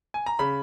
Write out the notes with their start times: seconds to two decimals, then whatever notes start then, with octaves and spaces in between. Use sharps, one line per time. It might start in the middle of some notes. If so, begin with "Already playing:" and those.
0.14 G#5
0.26 A#5
0.39 C#3 B5